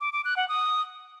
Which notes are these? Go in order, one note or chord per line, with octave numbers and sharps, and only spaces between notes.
D6
D6
F#6
F#5
D#6